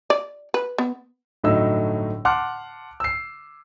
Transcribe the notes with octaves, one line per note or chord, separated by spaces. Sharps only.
D5
B4
B3
G1 A2 F#3 A3 D#4 E6
F#5 A5 C6 D6 F6 F#6
E6 C7